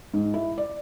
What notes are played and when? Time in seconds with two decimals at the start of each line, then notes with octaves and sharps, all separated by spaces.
0.14 G#2
0.34 E4
0.58 D5